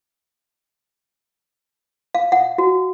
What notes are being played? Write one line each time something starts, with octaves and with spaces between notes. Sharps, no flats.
F5
F#5
F#4